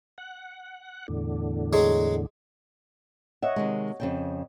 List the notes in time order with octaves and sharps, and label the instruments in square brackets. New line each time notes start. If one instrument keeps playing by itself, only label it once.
[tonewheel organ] F#5
E2 A2 D3
[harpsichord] F#3 G#3 G#4
[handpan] C#5 D#5 F#5 [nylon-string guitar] E5
[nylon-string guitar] C3 D#3 G#3
F2 C#3 G5